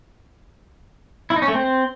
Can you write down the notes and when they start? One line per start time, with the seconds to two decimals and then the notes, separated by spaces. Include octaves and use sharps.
1.30 E4
1.36 D#4
1.42 C#4
1.48 A3
1.54 C4